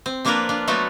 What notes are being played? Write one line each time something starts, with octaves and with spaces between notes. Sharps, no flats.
C4
F3 A#3 D4 F4 A#4 B4
D4 F4
F#3 A3 B3 F4 F#4 A4